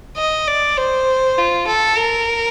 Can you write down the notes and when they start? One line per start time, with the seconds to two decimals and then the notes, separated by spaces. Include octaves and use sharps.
0.17 D#5
0.48 D5
0.77 C5
1.38 F4
1.67 A4
1.98 A#4